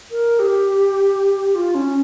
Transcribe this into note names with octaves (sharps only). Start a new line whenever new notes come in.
A#4
G4
F4
C#4